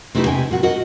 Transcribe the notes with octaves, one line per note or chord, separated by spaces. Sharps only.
C3 A3 D#4 E4 G4 B4
C3 G5 G#5
A#2 F#4
F#4 A#4 D#5 F#5